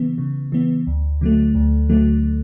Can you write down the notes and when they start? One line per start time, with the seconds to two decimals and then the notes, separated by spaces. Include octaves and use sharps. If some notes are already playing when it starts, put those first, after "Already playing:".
Already playing: C#3 E3 B3
0.18 C#3
0.52 E3 B3
0.87 D2
1.21 D3 F#3 A3
1.55 D2
1.89 D3 F#3 A3